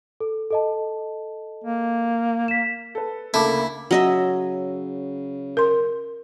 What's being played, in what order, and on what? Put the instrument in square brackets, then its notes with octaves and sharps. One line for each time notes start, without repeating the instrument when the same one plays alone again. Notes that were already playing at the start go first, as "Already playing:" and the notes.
[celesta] A4
A4 D#5 A5
[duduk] A#3
[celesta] B6 E7
[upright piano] A4 B4
[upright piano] D2 C#3 A3 [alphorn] A#3 [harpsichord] E4 [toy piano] A5 B5 D6
[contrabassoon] C#3 [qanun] F#3 D#5 E5
[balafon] A#4 C6